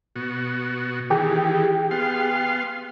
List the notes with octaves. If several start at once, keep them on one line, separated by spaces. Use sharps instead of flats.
B2 F#4
D#3 E3 G4 G#4 G5
B3 F5 C6